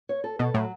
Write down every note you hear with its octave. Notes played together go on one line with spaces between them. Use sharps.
C#5
A4
B2 A4
A2 F#3